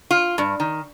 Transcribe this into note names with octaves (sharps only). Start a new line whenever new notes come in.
F4
G2
D#3